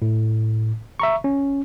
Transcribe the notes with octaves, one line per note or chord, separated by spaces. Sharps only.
A2
E5 A#5 C#6
C#4